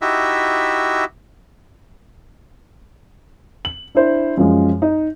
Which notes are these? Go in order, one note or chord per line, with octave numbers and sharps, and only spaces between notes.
D#4 E4 F#4 G4 E5
F#7
D4 E4 C5
F#2 F3 G#3
D#4